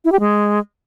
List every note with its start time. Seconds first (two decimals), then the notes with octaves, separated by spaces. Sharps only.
0.05 E4
0.12 G4
0.20 G#3